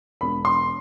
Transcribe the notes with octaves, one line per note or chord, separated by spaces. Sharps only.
E1 B5
C6